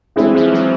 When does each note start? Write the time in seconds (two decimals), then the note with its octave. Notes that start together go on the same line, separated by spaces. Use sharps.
0.16 E3 G#3 C4 E4 G#4
0.34 F3
0.52 F#3